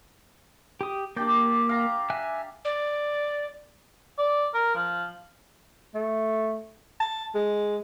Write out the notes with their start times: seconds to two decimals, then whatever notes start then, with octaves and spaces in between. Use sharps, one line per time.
0.81 G4 D#6
1.16 A#3 D4 G4 D5 G6
1.69 F5 A#5
2.10 E5 G#5 F#6
2.65 D5
4.18 D5
4.54 A#4
4.75 F3
5.95 A3
7.00 A5
7.35 G#3